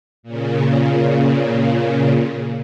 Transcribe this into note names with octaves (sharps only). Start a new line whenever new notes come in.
A#2 C#3